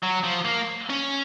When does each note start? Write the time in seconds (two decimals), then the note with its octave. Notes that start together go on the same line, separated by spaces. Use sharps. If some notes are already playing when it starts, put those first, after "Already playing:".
0.03 F#3
0.24 F3
0.46 A#3
0.89 C#4